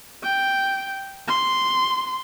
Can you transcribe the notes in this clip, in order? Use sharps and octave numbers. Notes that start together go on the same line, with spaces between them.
G5
C6